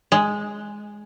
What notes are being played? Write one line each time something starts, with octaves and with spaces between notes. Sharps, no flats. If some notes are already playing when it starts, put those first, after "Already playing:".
G#3